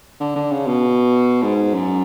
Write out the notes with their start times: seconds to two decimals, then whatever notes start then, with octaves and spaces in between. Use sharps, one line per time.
0.20 D3
0.36 D3
0.52 C#3
0.67 B2
1.42 G#2
1.74 F#2